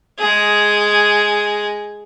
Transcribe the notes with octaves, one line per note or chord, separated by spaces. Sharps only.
G#3 G#4